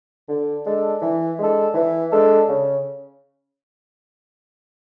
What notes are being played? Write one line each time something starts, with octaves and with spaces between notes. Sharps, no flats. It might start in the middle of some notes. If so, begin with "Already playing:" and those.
D3
G#3 D4 A4
E3
G#3 D4 A4
E3
G#3 D4 A4
C#3